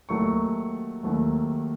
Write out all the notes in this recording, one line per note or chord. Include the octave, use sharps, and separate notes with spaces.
D#2 D#3 F#3 A3 C#6
D#2 D#3 F#3 A3